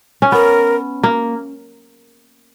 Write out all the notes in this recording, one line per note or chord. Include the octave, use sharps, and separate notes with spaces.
C#4
B3 A#4
A#3